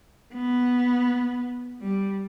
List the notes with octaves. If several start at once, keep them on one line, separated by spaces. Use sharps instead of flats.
B3
G3